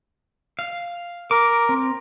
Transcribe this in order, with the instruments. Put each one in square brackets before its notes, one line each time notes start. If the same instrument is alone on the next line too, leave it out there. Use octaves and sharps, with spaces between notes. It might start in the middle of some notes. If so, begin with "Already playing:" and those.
[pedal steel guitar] F5
[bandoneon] A#4 [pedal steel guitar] D6
[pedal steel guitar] C4